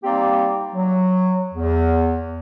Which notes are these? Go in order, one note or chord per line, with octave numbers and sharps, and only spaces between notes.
G3 A#3 C4 D#4 G4 D5
F#3
E2